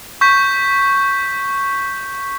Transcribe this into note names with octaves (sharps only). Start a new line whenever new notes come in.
C#6 G6 B6